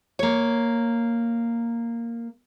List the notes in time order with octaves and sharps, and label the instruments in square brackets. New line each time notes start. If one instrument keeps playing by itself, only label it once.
[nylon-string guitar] A#3 C#5